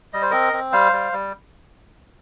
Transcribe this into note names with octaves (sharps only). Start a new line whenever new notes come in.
G3 D#5
C5
C4 A#4 D#5
C4
G3 C5 F5
G3
G3